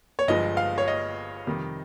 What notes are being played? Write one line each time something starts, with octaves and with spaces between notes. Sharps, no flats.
C#5
G1 G2 F3 G#3 D#5
F5
C#5
D#5
F2 C3 D#3 G3